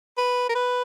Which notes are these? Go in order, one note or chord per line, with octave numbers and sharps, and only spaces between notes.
B4
A#4
B4